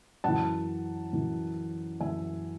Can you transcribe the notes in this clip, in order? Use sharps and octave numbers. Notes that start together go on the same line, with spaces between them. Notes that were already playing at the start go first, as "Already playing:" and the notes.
F#2 E3 F#5 A5
F#2 E3
F#2 E3 E5 G#5